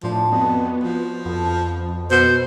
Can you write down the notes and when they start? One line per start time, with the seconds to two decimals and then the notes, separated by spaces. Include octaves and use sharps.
0.03 A2 F3 D4 C5
0.32 F2 B3 F#4 D#5
0.84 F3
1.25 F2 B3 A4
2.11 B2 C5